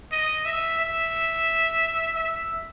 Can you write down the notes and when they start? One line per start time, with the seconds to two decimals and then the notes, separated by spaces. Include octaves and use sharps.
0.12 D#5
0.45 E5
0.79 E5
2.16 E5